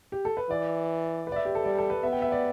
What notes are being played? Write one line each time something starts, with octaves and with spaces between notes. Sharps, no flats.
G4
A4
B4
E3 D5
B4
D5
E5
G4
A4
G3 D5
A4
B4
B3 E5
G5
E5
D5